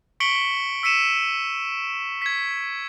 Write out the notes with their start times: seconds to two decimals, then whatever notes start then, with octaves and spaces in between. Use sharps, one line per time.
0.20 C#6 B6 C#7 D7 F#7 G7
0.83 E6 B6 C#7 D#7 E7
2.22 G#6 B6